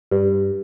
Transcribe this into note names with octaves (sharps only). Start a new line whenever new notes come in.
G2